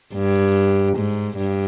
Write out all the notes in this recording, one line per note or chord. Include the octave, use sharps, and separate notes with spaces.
G2
G#2
G2